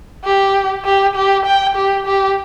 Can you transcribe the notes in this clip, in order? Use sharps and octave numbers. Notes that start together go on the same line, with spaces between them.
G4
G4
G4
G5
G4
G4